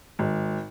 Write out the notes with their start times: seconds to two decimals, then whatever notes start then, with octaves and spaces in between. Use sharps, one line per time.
0.19 G#1